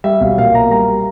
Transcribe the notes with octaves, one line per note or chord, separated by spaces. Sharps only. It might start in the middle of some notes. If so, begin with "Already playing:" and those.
G3 E5
B1 F5
A#2 F5
A#3 A#5
G3 A#5